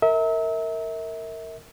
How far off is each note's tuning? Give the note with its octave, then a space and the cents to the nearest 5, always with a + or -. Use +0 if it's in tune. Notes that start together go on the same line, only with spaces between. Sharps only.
A#4 -20 E5 -35